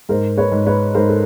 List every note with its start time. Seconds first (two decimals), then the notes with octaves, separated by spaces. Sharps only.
0.09 G#2 A#4 C5
0.37 B4 C#5
0.52 G#2
0.66 B4 C#5
0.94 G#2 A#4 C5
1.09 A4